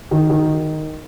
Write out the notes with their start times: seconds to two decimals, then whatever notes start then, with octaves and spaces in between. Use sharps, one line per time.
0.11 D#3
0.30 D#3